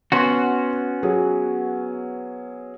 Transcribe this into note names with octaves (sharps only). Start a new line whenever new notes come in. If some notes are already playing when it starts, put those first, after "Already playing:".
B3 C#4 F#4 C6
F#3 G#4